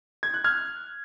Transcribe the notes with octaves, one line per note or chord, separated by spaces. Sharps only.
G#6
F#6
F6 G#6